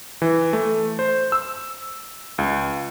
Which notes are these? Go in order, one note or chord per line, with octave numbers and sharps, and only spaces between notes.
E3
A3
C5
E6
C#2